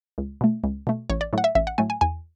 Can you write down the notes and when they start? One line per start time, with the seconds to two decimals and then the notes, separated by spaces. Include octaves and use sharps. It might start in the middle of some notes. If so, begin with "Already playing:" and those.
0.18 C#2
0.41 B2 A3
0.64 C#2
0.87 B2 A3
1.10 A1 C#5
1.21 D5
1.33 A2 F#3 A3 F#5
1.44 E5
1.55 A1 E5
1.67 F#5
1.78 A2 F#3 A3 G#5
1.90 G#5
2.01 E2 G#5